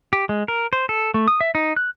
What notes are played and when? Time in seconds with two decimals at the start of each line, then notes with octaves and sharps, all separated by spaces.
0.13 G4
0.29 G#3
0.48 A#4
0.73 C5
0.89 A4
1.14 A3
1.28 D#6
1.41 E5
1.55 D#4
1.76 F#6